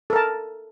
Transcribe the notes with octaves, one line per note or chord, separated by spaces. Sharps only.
A4 A#4 A5